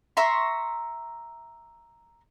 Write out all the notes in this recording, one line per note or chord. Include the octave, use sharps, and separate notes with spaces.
E5 A#5 C6 C#6